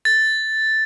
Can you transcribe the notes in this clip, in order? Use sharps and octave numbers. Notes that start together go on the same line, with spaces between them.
A6